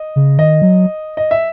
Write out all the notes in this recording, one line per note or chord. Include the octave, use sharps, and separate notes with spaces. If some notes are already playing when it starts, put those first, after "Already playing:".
Already playing: D#5
C#3
D#3 D#5
F#3
D#5
E5